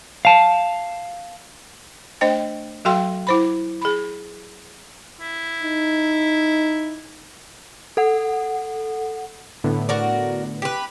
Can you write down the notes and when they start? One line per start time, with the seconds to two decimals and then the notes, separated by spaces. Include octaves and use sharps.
0.25 F5 A5
2.21 A3 D4 C5 D#5 G5
2.85 F#3 F#4 A4 F5 G5 C6
3.27 E4 C5 B5
3.81 G#4 B5
5.20 E4
5.63 D#4
7.97 A4 F#5
9.64 A2 D3 B3
9.89 F#4 A#4 D5
10.62 G4 B4